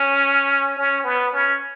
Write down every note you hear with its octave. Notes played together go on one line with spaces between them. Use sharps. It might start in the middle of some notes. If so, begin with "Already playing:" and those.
Already playing: C#4
C#4
B3
C#4